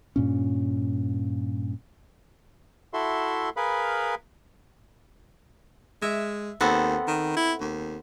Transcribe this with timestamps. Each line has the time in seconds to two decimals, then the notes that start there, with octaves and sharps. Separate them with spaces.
0.16 G2 A#2 C#4
2.94 E4 F#4 A4 E5 C6
3.57 G#4 A#4 B4 F5 B5
6.02 G#3 E5
6.61 D#2 B3 C4 A4
7.08 D#3
7.36 E4
7.61 D#2